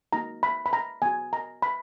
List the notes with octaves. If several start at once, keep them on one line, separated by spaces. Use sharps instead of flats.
A#3 D#4 F#4 A#5
B5
B5
A#5
B3 F#4 G#5
A#5
B5